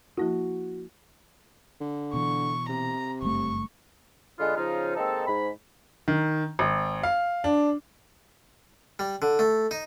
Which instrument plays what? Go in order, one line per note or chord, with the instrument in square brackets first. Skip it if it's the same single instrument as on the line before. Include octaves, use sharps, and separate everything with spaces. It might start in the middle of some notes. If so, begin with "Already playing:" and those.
[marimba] F3 A#3 E4 [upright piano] F#4
[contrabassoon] D3
[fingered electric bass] B2 E3 [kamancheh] C#6
[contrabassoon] C3 [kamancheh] A#5
[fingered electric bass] F#1 G2 A3 [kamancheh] C#6
[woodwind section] D3 G#3 B3 F4
C#3 F3 D#4 F4
D#3 G#3 A#3 C4 D#4 A4
G#2 B5
[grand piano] D#3
G#1
F5
D4
[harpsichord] G3
D3
A3
D#4